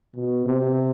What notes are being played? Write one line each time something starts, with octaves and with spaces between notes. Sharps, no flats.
B2
C3